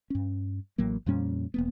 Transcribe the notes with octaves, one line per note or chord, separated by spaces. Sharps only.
G2 C#4
A1 A2 F#3 A#3
F2 A#2 G3 C#4
E1 A#3 B3